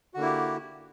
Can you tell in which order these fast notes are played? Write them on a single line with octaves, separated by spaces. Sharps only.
F#4 D3 A#3 E4 G4